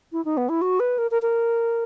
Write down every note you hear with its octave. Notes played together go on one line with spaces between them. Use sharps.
E4
D#4
B3
E4
F#4
B4
A#4
A#4
A#4